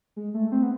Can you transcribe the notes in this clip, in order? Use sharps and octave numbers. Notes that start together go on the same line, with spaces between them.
G#3
A3
C4
B3